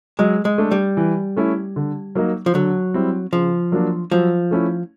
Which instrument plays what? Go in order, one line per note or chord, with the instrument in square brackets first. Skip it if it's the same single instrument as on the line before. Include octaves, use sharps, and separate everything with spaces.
[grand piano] F#3 [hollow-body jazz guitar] G#3
[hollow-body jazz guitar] G#3
[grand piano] A3 D4
[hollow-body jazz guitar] G3
[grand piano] E3
A3 C#4 E4
D3
F#3 A#3 D#4
[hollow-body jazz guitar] F3
[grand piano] D3 [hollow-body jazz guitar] F#3
[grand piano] G3 C4 E4
[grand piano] C#3 [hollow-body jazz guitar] F3
[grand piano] F#3 A#3 D4
[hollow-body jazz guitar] F3 [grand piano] F#3
[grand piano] A3 C#4 E4